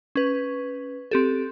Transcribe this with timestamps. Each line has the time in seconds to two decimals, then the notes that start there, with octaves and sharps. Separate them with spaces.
0.16 C#4 B4
1.11 C4 G4 A4